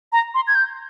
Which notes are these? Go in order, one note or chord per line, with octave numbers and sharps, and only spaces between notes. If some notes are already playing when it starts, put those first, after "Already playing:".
A#5
C6
G#6
G6